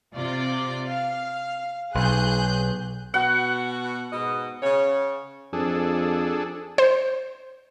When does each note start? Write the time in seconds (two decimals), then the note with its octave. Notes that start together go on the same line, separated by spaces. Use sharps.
0.14 C3 F4 D5
0.91 F5
1.95 B1 G#4 F#6 G6
3.14 B2 F#4 F#5
4.12 G#2 B2 D#5
4.63 C#3 C#5
5.53 F2 D4 G#4 A4
6.78 C5